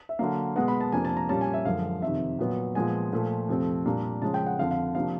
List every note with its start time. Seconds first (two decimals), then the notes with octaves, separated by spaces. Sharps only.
0.09 E5
0.19 D3 F#3 A#3 F5
0.56 B2 G#3 B3 F#5
0.68 B5
0.81 A5
0.92 F2 C3 F3 A#3 D4 G#5
1.05 A5
1.17 A#5
1.29 A#2 G3 A#3 C#4 A5
1.41 G#5
1.54 E5
1.65 F#2 D3 F3 G#3 F5
2.02 F2 C3 D#3 E5
2.39 A#2 F#3 B3
2.75 A#2 F3 G#3 B3 G#5
3.12 A#2 F3 A3
3.49 F2 C3 F3 A3 C4
3.86 A#2 G3 A#3 D4
4.22 C#3 F3 G#3 C#4 A5
4.34 G5
4.46 F#5
4.59 F2 D3 F3 F5
4.71 F5
4.95 C3 F3 A#3 D4 F5